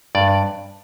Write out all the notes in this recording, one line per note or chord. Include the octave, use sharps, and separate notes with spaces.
G2 D5